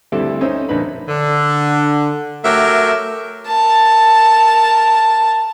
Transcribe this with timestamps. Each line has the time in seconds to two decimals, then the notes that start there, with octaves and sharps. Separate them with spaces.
0.12 D2 G2 C4 E4 G4 A4
0.41 C#4 D#4 C5 E5
0.69 A#1 D3 D#4 B4 B5
1.08 D3
2.45 F#3 A3 G4 A#4 E5
3.47 A#4 A5